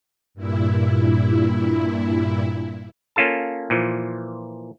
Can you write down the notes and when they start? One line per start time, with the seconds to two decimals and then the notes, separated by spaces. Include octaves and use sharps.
0.34 G2 A#2 E4
3.16 A#3 C#4 F4 A4 A5
3.70 A#2 E3 F3